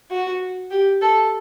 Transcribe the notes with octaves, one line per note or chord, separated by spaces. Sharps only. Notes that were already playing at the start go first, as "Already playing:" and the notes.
F#4
G4
A4